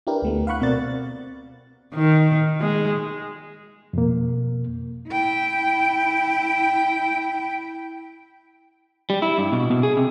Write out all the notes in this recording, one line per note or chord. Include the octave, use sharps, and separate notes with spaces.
D4 E4 G4 A#4 B4
D2 A3 B3
F5 F#5 B5 C#6 F#6
B2 C4 A#4 D5 A6
D#3
G#3
F2 B2 A#3
E4 G5
G3
E4
G2
B2
B2
G#4
C3